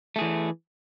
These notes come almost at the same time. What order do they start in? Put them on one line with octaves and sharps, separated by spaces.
A3 G#4 E3